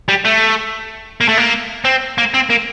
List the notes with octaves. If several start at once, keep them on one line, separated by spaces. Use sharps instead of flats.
G3
A3
A#3
A3
A#3
C4
A#3
C4
A#3